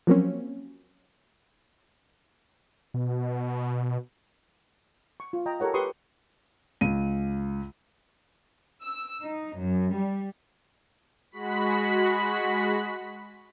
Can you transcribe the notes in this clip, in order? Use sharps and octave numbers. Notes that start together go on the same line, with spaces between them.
F3 F#3 A#3 C4 C#4
B2
C#6
F4
D#5 G5 A#5
G4 A4 A#4 C#5 F#5
G4 A#4 B4 C6 C#6 D#6
C#2 D#7
E6
D#4
F#2
G3
G#3 F#4 B5 B6